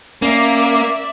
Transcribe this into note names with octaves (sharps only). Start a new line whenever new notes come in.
A#3 C#4 D5 E5